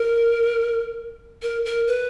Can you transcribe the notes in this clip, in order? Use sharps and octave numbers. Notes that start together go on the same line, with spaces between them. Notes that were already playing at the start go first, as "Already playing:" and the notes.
Already playing: A#4
A#4
A#4
B4